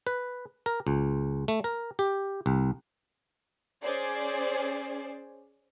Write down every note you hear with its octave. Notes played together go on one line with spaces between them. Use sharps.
B4
A#4
C#2
A3
A#4
G4
C2
C#4 G#4 C5 D5